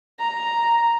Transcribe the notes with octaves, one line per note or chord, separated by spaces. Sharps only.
A#5